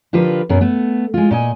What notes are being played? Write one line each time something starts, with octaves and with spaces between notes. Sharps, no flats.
D3 F3 F4 G4 A#4 B4
F#2 B2 B3 A#4
A3 B3
G#3 F4
A#2 D#5 G#5